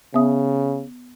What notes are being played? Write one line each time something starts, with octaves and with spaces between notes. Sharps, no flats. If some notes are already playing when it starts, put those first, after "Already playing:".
C#3 B3 E5 D#6